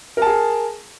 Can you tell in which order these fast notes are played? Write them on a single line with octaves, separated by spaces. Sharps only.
A#4 A5 G#4